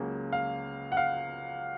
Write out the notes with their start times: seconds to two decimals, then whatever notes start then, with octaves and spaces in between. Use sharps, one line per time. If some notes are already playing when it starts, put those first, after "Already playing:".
Already playing: C#2 C#3 F#3 A#3 C#4
0.33 F5
0.92 F#5
0.97 F5